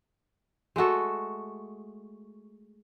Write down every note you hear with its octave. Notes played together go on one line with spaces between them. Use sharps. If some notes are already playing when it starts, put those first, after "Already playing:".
G#3 A3 F#4 A4